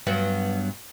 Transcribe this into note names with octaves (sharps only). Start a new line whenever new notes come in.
G2 F#3 B3